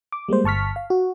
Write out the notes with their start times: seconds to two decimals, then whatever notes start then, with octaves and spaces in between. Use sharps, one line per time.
0.12 D6
0.29 G3 G#3 A#3 C5
0.44 G1 A5 C#6 F6 B6
0.76 F5
0.90 F#4